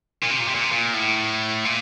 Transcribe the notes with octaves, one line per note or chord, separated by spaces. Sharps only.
A#2
C3
A#2
C3
A#2
C3
A#2
A2
A#2